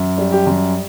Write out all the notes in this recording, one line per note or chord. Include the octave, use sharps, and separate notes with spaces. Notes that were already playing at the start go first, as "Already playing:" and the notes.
Already playing: F#2
G3
G4
F#2